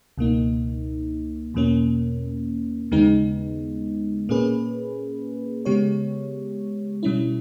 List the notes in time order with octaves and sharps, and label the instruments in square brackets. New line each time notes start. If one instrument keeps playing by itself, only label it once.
[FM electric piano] C#2 B2 A#3 D#4
E2 B2 A#3 C#4
D#2 C#3 G#3 B3 D#4
A#2 A#3 C#4 G#4 B4
C#3 G#3 B3 G4 C#5
B2 G3 C#4 E4